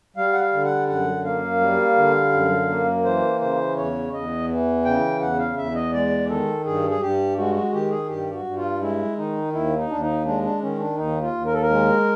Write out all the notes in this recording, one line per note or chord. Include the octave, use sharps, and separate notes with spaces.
G3 F5
F#5
F5
D3
F#5
F#2 F#5
A#3 F5
G3
D3
F#2
A#3
E3 C5
C#3 C5
E2 C#5
E2 D#5
E3
C#3 G5
E2 F#5
F5
E2 E5
D#5
G#3 D5
D#3 A4
G2 G#4
G#4
G2 G4
G#3 F#4
F#4
D#3 G4
G#4
G2 G4
F#4
G2
F4
G#3 E4
D#3 D#4
D#2 E4
D#4
D#2 D4
D#4
G#3 D4
D4
D#3 C#4
D4
D#2 D#4
F4
D#2
A#4
A4
A#4
G#3